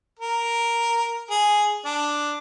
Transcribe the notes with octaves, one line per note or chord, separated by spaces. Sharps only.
A#4
G#4
D4